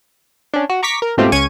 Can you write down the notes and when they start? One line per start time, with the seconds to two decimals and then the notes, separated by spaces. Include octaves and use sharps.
0.53 C#4 D4
0.69 F#4
0.83 A#5 C#6 D6 B6
1.02 A#4
1.17 G#2 B2 A3 C4 F4 G4
1.32 C#2 C#4 C#6 G#6 D#7